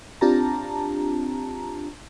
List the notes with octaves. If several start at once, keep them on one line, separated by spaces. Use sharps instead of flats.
C4 D4 F4 G4 A5 A#5